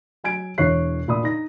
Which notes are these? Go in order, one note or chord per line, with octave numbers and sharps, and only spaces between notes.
F#3 G#5 G#6 D7
E1 E3 C#5 F#6 C7
A#2 D5 B5 D#6
D#4 A#6